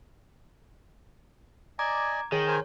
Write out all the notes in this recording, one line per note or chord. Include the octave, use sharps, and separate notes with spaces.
D5 D#5 G#5 A#5 D6 G#6
D#3 G#4 C#5
A#4 C5 G#5